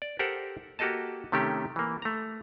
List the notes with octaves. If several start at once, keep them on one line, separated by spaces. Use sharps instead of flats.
D5
G4 A4 A#4 C5 F#5
A#3 F#4 G4 A4 D#5 A5
C3 D#3 A3 C#4 G4
E3 A#3
A3 A#5